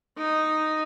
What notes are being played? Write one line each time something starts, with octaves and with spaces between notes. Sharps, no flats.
D#4